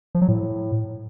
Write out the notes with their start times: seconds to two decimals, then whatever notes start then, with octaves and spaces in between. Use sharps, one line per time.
0.15 F3
0.21 F#3
0.28 A2